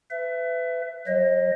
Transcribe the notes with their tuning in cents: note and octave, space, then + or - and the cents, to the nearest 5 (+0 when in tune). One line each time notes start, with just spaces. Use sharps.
B4 +30 E5 +20
F#3 +0 C5 +45 D#5 +0